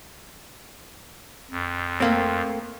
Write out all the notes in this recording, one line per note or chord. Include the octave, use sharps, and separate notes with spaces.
F2
A3 A#3 C4